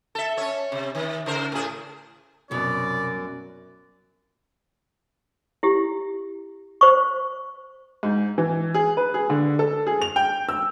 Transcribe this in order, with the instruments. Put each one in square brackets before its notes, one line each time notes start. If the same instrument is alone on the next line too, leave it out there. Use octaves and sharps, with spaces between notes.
[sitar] A4 E5
C#4 C#5
C3
D#3
C#3 A#4 C5
A2 G#4
[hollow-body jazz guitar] C2 B2 [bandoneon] F#2 [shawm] D5
[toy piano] E4 G4
C5 C#6
[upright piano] G#2
E3
G#4
B4
G#4
D3
A4
G#4
F7
G5
E6